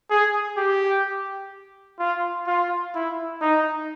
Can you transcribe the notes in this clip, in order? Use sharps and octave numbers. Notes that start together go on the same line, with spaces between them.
G#4
G4
F4
F4
E4
D#4